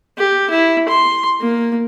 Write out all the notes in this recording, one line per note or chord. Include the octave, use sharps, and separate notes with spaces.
G4
E4
C6
A#3